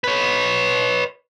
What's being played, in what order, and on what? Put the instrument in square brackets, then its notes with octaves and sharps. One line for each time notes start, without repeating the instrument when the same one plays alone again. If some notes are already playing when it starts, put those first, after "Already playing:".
[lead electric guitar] B4 C#5